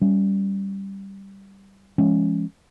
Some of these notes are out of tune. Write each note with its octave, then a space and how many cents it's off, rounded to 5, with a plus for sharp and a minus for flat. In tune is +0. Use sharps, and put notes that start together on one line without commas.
G3 +0 C#4 +0
F3 -40 G#3 +0 C#4 +0